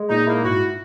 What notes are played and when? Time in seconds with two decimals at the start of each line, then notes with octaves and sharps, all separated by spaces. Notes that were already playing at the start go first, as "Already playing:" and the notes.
Already playing: G#3
0.10 A#2 D#4
0.27 A#3 E4
0.45 G#2 F#4